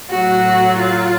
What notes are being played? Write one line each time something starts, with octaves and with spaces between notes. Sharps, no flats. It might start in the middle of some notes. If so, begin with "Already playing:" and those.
A2 F#3 F#4
F4